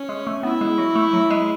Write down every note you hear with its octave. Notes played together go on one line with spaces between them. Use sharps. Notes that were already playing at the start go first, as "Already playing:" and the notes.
Already playing: C#4
G#3
A3
B3 E4
G#3
F#3
A3
F#3
G#3